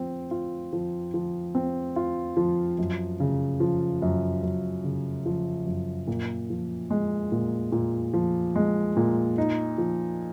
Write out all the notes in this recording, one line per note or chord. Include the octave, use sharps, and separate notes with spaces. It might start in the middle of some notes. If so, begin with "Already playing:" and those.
Already playing: F3 C4
F4
F3
F3
C4
F4
F3
F#2
C#3
F3
F#2
F#2
C#3
F3
F#2
A#2
F3
G#3
A#2
A#2
F3
G#3
A#2
D#4
F3